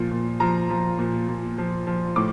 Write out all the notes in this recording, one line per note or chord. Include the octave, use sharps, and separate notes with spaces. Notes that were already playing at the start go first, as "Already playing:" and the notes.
Already playing: A#2 F3
A#2
F3 A#5
F3
A#2
A#2
F3
F3
A2 D6